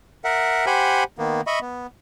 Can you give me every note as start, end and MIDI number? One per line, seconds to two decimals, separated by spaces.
0.24 0.66 70
0.24 0.66 76
0.24 0.66 78
0.66 1.04 67
0.66 1.04 72
0.66 1.04 78
0.66 1.04 80
0.66 1.04 83
0.66 1.04 91
1.18 1.41 51
1.18 1.41 58
1.18 1.41 59
1.47 1.59 75
1.47 1.59 76
1.47 1.59 83
1.47 1.59 85
1.61 1.87 59